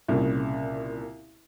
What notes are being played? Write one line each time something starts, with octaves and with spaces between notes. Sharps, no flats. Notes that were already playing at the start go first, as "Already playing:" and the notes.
C2 A#2 C#3